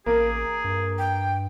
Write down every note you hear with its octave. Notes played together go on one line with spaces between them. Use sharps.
A1 A#3 G#4
G2
G5